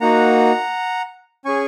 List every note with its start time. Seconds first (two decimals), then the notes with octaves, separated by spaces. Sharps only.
0.01 A#3 D#4 F#4 F#5 A#5
1.45 C#4 G#4 G#5 C#6